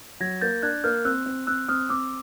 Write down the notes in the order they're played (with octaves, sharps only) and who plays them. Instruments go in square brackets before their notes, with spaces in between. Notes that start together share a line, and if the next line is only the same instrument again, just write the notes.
[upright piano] F#3 [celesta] G#6 A#6
[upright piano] A#3 [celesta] G6 A6
[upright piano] D4 [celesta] F#6 G#6
[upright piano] A#3 [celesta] F6 G6
[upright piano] C4 [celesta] E6 F#6
[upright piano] C4
[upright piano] C4 [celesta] E6 F#6
[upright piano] C4 [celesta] D#6 F6
[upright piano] C4 [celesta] D6 E6